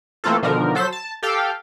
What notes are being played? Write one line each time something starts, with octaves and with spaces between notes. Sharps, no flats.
E3 A3 A#3 C4 F4 A4
B2 D3 D#3 F3 A#4
F#3 A4 C5 B6 E7
A5
G4 A4 F5 G5